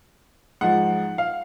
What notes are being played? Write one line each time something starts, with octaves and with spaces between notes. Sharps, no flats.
G#2 F3 F#5
F5